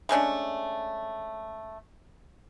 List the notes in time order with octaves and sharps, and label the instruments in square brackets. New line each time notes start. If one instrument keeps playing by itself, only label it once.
[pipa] G#3 A3 C#4 D4